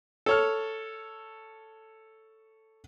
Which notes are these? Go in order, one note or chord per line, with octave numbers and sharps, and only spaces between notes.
A4 C#5 F6